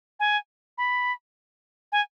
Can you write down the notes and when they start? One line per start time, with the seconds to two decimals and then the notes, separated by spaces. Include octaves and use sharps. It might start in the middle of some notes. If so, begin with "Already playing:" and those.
0.20 G#5
0.78 B5
1.92 G#5